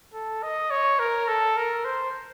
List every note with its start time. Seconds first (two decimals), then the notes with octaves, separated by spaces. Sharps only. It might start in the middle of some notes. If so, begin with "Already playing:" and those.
0.14 A4
0.43 D#5
0.70 C#5
0.99 A#4
1.28 A4
1.57 A#4
1.85 C5